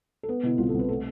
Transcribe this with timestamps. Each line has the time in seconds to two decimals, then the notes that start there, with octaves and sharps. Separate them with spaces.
0.23 A4
0.28 B3 B4
0.43 B2 E4
0.58 C2 F4
0.69 C2 A4
0.79 B4
0.89 A3 A4